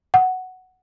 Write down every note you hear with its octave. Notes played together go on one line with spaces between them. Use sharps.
F#5